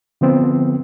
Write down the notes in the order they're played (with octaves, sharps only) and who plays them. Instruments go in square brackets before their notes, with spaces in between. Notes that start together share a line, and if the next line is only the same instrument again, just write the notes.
[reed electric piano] D3 F3 B3 C4